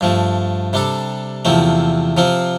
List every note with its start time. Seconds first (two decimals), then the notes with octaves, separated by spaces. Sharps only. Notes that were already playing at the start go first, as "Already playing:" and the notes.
0.01 G2 F3 A3
0.73 C3 G3 D4 A4
1.45 E2 C3 F3 A3 C4
2.17 C3 F3 C4 F4